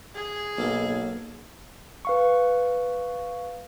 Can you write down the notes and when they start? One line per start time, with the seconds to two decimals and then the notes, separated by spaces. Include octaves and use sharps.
0.15 G#4
0.58 B1 A#3 A4
2.05 B4 F5 C#6